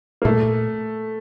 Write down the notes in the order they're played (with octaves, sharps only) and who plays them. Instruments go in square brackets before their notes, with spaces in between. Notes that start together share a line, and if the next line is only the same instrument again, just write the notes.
[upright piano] A#3
[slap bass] A#2 [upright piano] A3